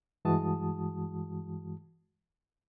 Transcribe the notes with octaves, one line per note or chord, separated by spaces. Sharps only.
G2 E3 G#3 F#4 A5 D#6